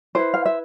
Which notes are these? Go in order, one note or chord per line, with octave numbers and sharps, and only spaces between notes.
E4 B4 C5
F5
E5